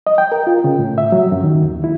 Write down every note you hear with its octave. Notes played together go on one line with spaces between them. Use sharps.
D#5
G5
A#4
F4
C#3
A2
E5
F#3
F#2
D#3
D#2
E4